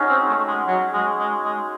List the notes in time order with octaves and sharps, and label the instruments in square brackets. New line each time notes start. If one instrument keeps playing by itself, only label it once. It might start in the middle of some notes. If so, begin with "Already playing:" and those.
Already playing: [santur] C#4 D#4 F#4 G#4
[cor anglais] C4
A3
G#3
F#3
G#3
G#3
G#3